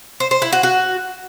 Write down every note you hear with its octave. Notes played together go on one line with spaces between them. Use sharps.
C5
C5
E4
F#4
F#4